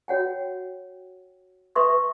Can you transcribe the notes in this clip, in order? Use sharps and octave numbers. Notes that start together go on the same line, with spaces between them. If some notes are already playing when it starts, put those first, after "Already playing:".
F#4 C#5 F#5 G5
B4 E5 C6 C#6 D#6